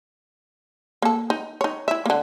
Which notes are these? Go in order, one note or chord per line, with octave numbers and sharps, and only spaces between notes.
A#3 A4
D#4
D#4 C#5
E4 E5
D3 A#3